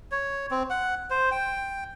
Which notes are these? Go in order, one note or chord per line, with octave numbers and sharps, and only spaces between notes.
C#5
C4
F#5
C5
G5